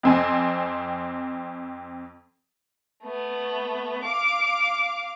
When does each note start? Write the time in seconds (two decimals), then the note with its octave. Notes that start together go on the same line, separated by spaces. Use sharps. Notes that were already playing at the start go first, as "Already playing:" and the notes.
0.03 F2 C4 G#5
3.03 A3 B3
4.03 F5 D6